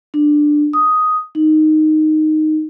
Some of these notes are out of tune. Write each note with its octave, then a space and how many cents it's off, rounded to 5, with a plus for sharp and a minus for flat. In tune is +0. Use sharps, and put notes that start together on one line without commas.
D4 +10
D#6 +5
D#4 -5